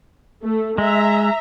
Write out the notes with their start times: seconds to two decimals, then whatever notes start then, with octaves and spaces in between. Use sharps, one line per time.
0.44 A3
0.78 G#3 E5 A#5